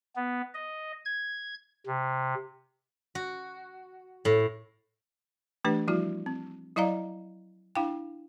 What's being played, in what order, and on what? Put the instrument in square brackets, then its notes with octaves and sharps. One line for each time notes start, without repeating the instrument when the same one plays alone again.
[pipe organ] B3
D#5
G#6
C3
[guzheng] F#4
A2
[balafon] E3 A3 D4 G4 B4
F3 G3 E4 F#4
C4
F#3 E4 D5 D#5 F5 A#5
D4 E4 F5 G5